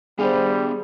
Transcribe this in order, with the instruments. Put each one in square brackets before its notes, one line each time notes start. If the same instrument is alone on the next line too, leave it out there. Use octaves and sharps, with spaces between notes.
[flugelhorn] G3 [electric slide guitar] B3 D4 F5 [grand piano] G#4 C5